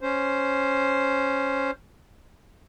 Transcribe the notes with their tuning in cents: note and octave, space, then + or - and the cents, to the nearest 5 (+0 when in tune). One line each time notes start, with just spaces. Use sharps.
C#4 +0 C5 +0